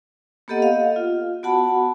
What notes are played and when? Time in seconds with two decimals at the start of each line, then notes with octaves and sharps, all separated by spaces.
0.48 A#3 B3 G4 A4 D#5 F#5
0.62 D#5 F5
0.96 F4
1.43 B3 F#4 F#5 A5 B5